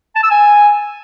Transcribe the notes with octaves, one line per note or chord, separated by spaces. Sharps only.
A5
E6
G#5